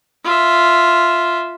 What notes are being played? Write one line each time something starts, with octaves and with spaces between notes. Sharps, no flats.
F4 E5